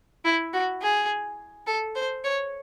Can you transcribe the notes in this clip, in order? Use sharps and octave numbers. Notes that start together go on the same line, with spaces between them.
E4
F#4
G#4
A4
C5
C#5